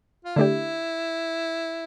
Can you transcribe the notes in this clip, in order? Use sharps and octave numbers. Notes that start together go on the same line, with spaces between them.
F4
D3 A3 D4 E4 G4